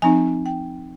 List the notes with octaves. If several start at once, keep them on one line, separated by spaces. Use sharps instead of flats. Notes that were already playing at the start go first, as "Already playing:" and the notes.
F3 C4 D#4 G#5
G5